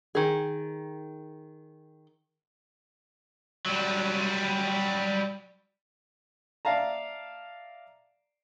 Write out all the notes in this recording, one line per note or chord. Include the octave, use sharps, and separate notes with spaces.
D#3 G#4
F#3 G3
D5 E5 F5 A5 A#5